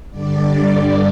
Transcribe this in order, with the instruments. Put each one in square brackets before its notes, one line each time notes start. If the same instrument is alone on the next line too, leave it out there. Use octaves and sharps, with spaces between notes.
[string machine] G2 D3 G3 D5